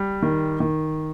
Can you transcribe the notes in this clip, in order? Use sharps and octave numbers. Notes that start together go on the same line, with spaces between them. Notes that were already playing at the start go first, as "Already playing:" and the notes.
Already playing: G3
D#3
D#3